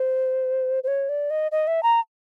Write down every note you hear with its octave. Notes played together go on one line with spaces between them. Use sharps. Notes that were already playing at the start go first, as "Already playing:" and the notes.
Already playing: C5
C5
C#5
D5
D#5
D#5
E5
A#5